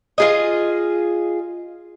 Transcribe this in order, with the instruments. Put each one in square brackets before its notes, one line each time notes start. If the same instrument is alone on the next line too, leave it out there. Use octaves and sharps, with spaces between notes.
[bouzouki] F4 G#4 D#5